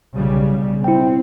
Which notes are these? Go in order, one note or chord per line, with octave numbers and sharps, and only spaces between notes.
B1 C#3 G3
C4 E4 G5